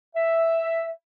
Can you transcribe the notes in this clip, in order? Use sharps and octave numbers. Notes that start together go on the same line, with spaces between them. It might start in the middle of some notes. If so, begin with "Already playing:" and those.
E5